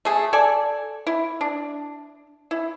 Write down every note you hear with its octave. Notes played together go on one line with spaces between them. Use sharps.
A3 G#4
A4 D5 G#5
E4
D4
E4